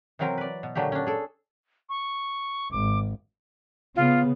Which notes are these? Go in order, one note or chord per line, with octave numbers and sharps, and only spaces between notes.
C3 E3 F#3 C4 A#4
B4 D5
B2
A#2 D3 F#3 A3 G4
C#4 D4
G#4 A4
C#6
G#1 D6
C#3 B3 F4